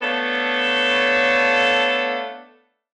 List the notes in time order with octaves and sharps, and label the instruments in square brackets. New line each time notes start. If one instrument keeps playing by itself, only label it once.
[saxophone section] A3 B3 D4 A4 C#5 F5